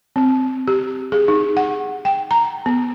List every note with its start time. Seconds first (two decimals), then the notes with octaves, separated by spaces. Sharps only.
0.16 C4
0.68 G4
1.12 G#4
1.28 D#4
1.57 F#5
2.05 G5
2.31 A#5
2.66 B3